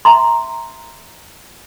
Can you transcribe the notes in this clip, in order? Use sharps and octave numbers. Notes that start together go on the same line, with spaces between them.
E5 A#5 C6